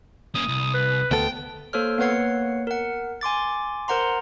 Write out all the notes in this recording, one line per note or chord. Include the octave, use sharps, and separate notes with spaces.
A#3 C#4 D#6
C2
B4
D2 B3 A4 G5
A#3 A4 C5 C#5 F6
A#3 B3 B4 C#5 F#5 C7
A#4 F#5
G#5 C6 D6 A6
A#4 C5 F#5 A#5 C6